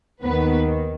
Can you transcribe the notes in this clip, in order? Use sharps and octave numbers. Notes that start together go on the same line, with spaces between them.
D#2 D#3 B3 B4